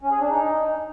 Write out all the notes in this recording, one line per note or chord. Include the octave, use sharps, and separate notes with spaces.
C#4
G#4
D4
D#4